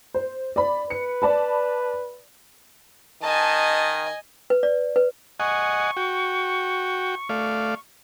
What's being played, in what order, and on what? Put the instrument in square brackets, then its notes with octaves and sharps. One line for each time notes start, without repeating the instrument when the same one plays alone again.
[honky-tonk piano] C5
D5 B5
[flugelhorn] B4 [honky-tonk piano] C#7
[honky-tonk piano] D5 A5 B5
[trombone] D#3 [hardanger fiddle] D#5 G#5 [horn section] A5
[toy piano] B4
D5
B4
[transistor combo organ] D#5 F#5 G#5 [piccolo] C#6
[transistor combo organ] F#4 G5
A3 D5 F5